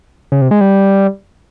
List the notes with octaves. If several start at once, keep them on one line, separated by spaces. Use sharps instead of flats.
C#3
C3
G#3
G3